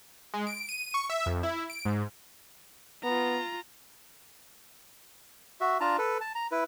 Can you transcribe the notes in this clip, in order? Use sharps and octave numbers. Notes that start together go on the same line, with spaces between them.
G#3
D7
D#7
C#6
E5
F2
E4
D7
G#2
B3 F4 A#5
F#4 E5
D4 F4 A5 A#5
A4 B4
A5
A#5
E4 B4